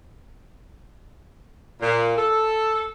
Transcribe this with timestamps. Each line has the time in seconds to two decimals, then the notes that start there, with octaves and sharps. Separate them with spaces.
1.80 A#2
2.15 A4